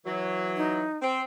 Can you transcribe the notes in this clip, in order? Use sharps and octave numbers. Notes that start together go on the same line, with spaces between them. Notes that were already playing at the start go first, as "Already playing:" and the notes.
E3 F#3
D#4
C4